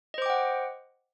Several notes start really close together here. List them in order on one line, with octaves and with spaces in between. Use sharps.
D#5 C5 D6 G5 F#5